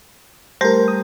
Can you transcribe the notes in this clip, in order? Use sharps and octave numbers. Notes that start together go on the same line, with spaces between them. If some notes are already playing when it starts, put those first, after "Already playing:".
G3 A3 G4 A#4 C5
D#6